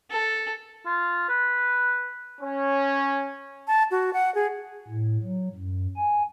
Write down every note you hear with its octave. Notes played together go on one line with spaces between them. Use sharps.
A4
F4
B4
C#4
A5
F#4
F#5
G#4
A2
F#3
F#2
G#5